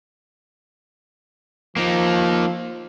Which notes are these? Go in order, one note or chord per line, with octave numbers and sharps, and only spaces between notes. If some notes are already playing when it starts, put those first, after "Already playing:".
F3 A#3 D#4